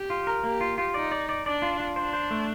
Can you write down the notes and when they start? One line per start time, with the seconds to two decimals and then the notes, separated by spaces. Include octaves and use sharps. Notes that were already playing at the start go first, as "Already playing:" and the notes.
Already playing: G4
0.10 F4
0.27 A#4
0.44 A#3 G4
0.61 F4
0.78 F4
0.94 D#4 D5
1.12 D5
1.29 D5
1.45 D4 D5
1.62 F4
1.80 F4
1.96 D4 C5
2.13 C5
2.31 A3